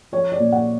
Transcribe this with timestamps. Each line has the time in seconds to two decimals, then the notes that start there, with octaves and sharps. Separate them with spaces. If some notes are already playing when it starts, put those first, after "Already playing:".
0.12 F3 C#5
0.32 D5
0.39 A#2
0.52 F#5